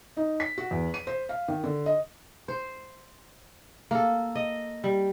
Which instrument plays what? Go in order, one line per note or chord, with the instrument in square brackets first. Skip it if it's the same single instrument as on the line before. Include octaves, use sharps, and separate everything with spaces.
[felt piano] D#4
B6
F#4
E2
D#7
C5
F5
D#3
D3
D#5
[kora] C5
A#3 A4
D#5
G3